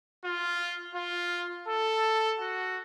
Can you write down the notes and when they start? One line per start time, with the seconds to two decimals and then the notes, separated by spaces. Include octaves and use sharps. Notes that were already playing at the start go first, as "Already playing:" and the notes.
0.25 F4
0.94 F4
1.68 A4
2.40 F#4